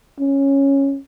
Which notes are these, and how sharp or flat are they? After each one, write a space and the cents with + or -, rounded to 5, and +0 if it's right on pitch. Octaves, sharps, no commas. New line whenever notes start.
C#4 -10